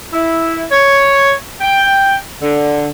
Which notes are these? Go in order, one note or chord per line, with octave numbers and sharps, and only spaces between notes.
E4
C#5
G5
D3